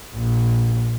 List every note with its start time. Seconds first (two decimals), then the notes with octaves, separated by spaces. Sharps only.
0.14 A#1